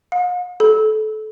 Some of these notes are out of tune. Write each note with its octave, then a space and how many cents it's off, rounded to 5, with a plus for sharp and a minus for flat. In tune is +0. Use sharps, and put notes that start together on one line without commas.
F5 +45
A4 -25